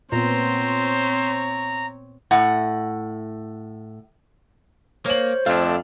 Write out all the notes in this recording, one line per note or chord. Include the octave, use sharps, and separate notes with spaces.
A#2 B3 C4 C5 C#5 A#5
A2 F#5
A#3 C5 C#5 F#7
F2 A3 D4 F5